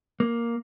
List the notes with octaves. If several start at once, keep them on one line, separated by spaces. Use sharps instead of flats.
A#3